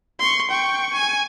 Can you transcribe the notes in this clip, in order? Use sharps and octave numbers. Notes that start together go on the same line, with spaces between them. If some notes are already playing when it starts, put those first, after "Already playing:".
C6 C#6
G5 C#6
G#5